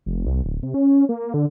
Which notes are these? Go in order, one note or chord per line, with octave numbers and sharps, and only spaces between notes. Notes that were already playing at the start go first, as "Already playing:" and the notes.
F1
C2
D1
C3
C#4
A#3
D3